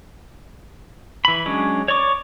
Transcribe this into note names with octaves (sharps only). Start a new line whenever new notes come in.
E3 B5
F#3 G#3 C#4 D4
C#5 D5 C#6 D6